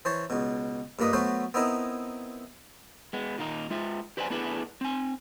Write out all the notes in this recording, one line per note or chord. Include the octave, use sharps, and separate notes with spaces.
E3 C5 C#5 A5
C#2 B2
G2 A#2 A#3 B4 D#5
F#3 A3 B3 F#4 C5
B3 C4 D#4 E4 A#4
G#3 B3
A#2 D#3 A#3 D#4
G#3 F4 E5
G4 B4 C5 D5 F5 G#5
A3 B3 D4 E4 G#4 B4
C4 G#5